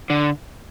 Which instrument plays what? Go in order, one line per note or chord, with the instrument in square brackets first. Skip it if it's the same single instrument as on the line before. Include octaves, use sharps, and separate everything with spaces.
[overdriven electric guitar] D3